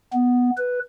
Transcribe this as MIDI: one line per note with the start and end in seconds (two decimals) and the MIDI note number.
0.13 0.50 59
0.58 0.80 71